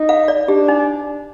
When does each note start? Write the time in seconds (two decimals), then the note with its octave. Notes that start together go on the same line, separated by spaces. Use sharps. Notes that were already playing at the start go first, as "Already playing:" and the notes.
Already playing: D#4
0.09 F5
0.28 D5
0.48 D4 G4
0.68 D#4